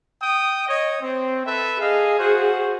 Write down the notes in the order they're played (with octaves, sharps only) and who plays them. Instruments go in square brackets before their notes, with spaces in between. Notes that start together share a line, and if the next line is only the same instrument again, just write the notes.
[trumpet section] G5 D#6
C#5 D#5
C4
A4 B4 E5
[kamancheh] G#4 [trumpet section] D#5 F5
[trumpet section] F#4 C5 F#5